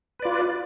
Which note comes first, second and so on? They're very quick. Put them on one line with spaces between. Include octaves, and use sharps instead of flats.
B4 D5 F4